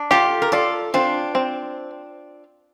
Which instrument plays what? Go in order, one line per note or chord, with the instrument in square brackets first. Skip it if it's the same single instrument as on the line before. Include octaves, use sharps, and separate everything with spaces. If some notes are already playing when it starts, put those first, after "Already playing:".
Already playing: [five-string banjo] D4
[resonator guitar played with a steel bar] F4 A4 [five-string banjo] G4
[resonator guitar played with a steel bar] A#4
[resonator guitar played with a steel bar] F4 A4 [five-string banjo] D5
[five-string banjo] C4 [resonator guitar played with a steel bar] D4 F4
[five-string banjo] C4